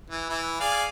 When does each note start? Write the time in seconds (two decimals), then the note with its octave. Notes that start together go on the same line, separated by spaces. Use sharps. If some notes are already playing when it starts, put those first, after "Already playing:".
0.10 E3
0.29 E3 E4
0.60 G#4 D5 F5